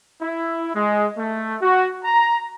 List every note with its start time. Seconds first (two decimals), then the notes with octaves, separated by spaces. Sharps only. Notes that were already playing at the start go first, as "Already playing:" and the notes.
0.20 E4
0.73 G#3
1.16 A3
1.61 F#4
2.04 A#5